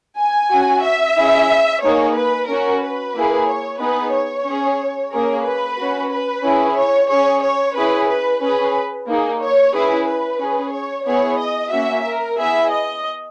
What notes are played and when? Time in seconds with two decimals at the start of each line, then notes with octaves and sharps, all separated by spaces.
0.18 G#5
0.51 C#4 F#4
0.84 E5
1.17 C#4 E4 G#4
1.83 A#3 D#4 G#4 C#5
2.16 B4
2.49 C#4 F#4 A#4
2.82 B4
3.15 A#3 E4 G#4
3.48 C#5
3.81 B3 D#4 G#4 B4
4.14 C#5
4.46 C#4 G#4
5.13 A#3 C#4 G#4 A#4
5.46 B4
5.79 C#4 F#4
6.11 B4
6.45 C#4 E4 G#4
6.77 C#5
7.10 C#4 G#4 C#5
7.43 C#5
7.76 C#4 E4 G#4 B4
8.09 B4
8.42 C#4 G#4 B4
9.08 A#3 D#4 G#4
9.41 C#5
9.74 C#4 E4 G#4 B4
10.07 B4
10.40 C#4 G#4
10.73 C#5
11.06 B3 E4 G#4 C#5
11.39 D#5
11.72 A#3 C#4 F#4 E5
12.05 A#4
12.38 B3 E4 G#4 E5
12.71 D#5